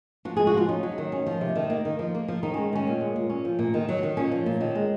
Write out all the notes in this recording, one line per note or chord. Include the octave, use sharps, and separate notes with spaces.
F3 F#4
G#3 G#4
F#4
F3 F4
C#4 D#4
F#3
D#3
C#4
F3
C3
D#3
A#3
D#3
F3
A#3
F3
D#3 D#4
G#3 C#4
D#3 C#4
A#2
G#3
A#2
C#4
F3
A#2
D#3
F#3
D#3
A#2 C#4
F3
A#2
D#3
G#3